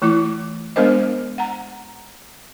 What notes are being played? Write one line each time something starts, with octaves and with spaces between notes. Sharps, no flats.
E3 A3 E4 D6
G#3 B3 D4 A#4 C5 D#5
F#5 A#5